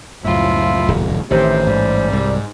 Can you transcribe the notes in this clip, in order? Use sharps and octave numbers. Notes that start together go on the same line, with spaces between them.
C#2 F#2 A2 F3 E4 F4
D#1
A1 C3 D#3 C5
G#2 G3
C2